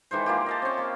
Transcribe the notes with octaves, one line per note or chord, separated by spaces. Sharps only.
D#3 E3 G#3 C5
A#3 F4 G4
D#5 F5 A5
C4 C#4
A#3